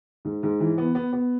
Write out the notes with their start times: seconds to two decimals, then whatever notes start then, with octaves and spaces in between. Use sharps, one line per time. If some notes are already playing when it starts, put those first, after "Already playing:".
0.25 G#2
0.43 G#2
0.60 E3
0.78 B3
0.95 B3
1.13 B3